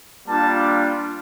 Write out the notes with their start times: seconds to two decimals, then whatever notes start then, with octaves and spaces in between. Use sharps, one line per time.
0.28 G3 A#3 D4 F4 A5